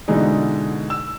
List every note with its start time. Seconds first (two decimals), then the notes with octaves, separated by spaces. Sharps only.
0.08 B2 D3 E3 G#3 D#4
0.90 E6